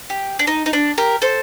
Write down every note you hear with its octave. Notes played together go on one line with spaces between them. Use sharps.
G4
D4
D#4
D#4
D4
G4 A#4
A4 C5